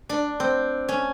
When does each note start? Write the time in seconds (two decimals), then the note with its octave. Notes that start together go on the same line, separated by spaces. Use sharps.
0.09 D4
0.40 C4
0.88 C#4